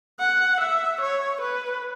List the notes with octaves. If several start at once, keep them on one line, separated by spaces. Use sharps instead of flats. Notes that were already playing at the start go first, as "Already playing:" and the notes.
F#5
E5
C#5
B4